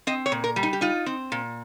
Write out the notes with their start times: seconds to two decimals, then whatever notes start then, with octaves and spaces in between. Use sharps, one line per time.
0.07 C4 D#5
0.26 C#5
0.32 A#2
0.44 A#4
0.56 G3
0.63 D#4
0.73 G4
0.81 D#4 F4
1.06 C4
1.32 A#2